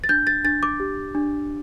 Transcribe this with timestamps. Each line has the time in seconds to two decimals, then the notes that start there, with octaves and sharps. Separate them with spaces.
0.04 A6
0.09 D4 G6
0.27 A6
0.44 D4 A6
0.63 D6
0.80 G4
1.15 D4